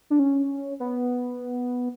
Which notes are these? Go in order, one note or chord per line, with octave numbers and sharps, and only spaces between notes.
D4
C#4
B3